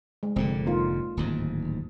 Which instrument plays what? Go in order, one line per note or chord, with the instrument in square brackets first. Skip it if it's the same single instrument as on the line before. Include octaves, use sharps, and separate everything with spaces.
[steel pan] G#3
[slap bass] F1 A#2 D3 [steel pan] G#3 C4
[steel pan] A#3 D#4 F4
[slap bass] D1 D#2 G#2